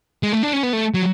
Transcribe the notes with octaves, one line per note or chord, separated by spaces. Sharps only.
G#3
A3
D4
C#4
B3
A3
F#3